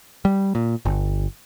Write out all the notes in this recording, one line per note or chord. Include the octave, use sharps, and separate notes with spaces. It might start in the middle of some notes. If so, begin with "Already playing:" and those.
G3
A#2
G1